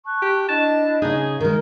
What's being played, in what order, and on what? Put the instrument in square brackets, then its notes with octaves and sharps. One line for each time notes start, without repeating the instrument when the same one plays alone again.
[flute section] A5 C#6 F#6
[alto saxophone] G4
[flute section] D4 E4 D#5 [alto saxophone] A5
[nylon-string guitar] C#3 D#4 [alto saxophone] G#4
[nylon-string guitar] D#3 G#3 [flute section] A#4